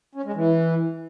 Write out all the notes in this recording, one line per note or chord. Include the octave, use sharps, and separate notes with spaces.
C#4
G#3
E3